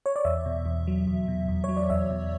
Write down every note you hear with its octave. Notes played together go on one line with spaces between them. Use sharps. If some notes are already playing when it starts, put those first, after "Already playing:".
C#5
D5
E2 E5
B2
E2
F#3
E2
B2
E2
F#3 C#5
D5
E2 E5
B2